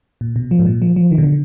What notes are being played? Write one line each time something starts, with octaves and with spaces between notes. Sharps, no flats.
A#2
B2
F3
G#2
A#2
F3
F3
D#3
B2
D3